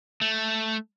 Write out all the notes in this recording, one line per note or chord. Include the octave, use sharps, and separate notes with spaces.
A3